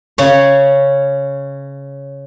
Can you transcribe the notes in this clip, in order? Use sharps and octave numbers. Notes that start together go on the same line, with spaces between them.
C#3 C#4 C#5